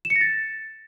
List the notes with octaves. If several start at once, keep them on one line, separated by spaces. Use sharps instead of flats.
E7
C#7
A#6
A6